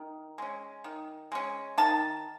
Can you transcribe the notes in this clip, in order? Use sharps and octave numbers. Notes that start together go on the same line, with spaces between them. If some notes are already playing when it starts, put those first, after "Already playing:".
Already playing: D#3
G#3 C#4
D#3
G#3 C#4
D#3 A5